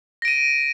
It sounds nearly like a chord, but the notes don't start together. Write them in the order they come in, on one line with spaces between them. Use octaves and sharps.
A#6 D7 D#7